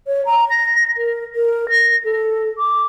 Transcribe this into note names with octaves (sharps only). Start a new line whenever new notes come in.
C#5
A#5
A#6
A#4
A#4
A#6
A4
D6